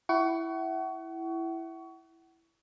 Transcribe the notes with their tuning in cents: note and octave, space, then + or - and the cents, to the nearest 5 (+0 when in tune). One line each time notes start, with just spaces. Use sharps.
E4 +5 F#5 +35 C#6 +20